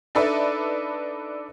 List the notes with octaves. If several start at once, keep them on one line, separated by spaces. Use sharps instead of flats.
D4 D#4 A4 B4 D5 E5